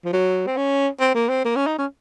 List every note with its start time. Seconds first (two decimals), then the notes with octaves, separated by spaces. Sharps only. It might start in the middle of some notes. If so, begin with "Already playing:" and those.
0.05 F3
0.13 F#3
0.47 C4
0.57 C#4
1.00 C4
1.14 A#3
1.29 C4
1.45 A#3
1.56 C#4
1.67 D#4
1.78 C#4